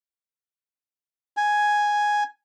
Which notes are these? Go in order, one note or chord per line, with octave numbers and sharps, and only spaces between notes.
G#5